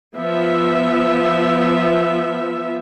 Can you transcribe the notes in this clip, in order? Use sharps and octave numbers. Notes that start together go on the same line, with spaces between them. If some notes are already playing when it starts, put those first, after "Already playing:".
F3 B3 E5